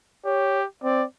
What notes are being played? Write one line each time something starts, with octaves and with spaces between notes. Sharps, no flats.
G4 C#5
C4 D5